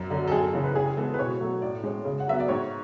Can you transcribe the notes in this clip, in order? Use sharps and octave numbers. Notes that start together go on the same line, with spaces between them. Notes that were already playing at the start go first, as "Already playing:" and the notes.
Already playing: F#2
D3 F#3
A4
F#2 G#4
A4
C#3 E3
B4
C#3 G#4
G#4
E3 G#3 B3 A4
B4
B2 C#5
F#3 A3
A2 D5
G#3 C#4
C#3
F#5
F#3 B3 E5
D5
G#2 C#5